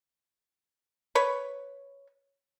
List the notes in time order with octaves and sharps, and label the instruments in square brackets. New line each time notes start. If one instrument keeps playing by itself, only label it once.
[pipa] B4 C#5